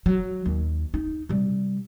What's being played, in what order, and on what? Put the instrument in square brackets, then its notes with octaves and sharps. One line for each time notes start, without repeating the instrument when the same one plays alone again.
[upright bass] F#3
D#2
D#4
C3 G3